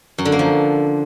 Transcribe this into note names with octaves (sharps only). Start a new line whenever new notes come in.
F#2
D3
A#3
F3